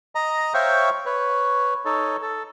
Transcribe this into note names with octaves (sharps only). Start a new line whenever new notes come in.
D#5 A#5
C5 C#5 E5 F5 G5 C#6
B4 C#5
D#4 A4 C#5
A4